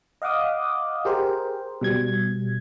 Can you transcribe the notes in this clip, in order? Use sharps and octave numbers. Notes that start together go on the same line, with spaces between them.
D#5 F5 F#5 D6 D#6
G4 G#4 A#4 C5
B2 G3 G#6